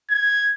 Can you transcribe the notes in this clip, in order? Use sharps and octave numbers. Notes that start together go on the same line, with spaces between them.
G#6